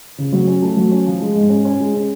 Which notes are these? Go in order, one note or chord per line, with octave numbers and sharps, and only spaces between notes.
C#3
F#3
C#4
A3
F#3
C#4
F3
G#3
G#2
C#4
C#4
G#3
C#4